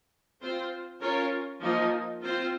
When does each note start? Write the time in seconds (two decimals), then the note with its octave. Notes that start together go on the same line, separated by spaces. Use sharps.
0.41 C4 F4 C5
1.01 C#4 F4 A#4 C#5
1.61 F3 A#3 D#4
2.22 C4 F4 C5